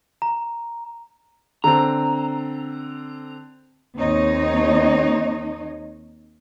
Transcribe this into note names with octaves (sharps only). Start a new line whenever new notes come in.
A#5
D3 C4 A#5
D#2 C4 D#4 C#5 D#5